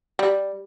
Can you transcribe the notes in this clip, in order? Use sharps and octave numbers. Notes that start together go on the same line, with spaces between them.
G3